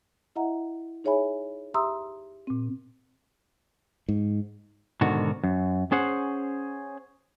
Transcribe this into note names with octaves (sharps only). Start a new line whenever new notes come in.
E4 D#5 E5 F#5 A#5
D#4 G#4 C#5 E5 G#5 B5
G4 E5 A#5 C6 D#6 E6
A#2 C4
G#2
G#2 B2 D3 D#3 F#4
F#2
C#4 G#4 C5 F#5